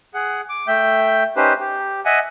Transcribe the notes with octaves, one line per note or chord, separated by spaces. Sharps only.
G#4 F#5
D6
A3 E5 G5 G6
C#4 D#4 G4 B4 C5
G4
D#5 E5 F#5 G#5